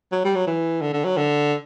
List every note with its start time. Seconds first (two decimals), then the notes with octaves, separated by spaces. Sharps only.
0.12 F#3
0.25 G3
0.35 F#3
0.47 E3
0.82 D3
0.94 D3
1.05 F#3
1.17 D3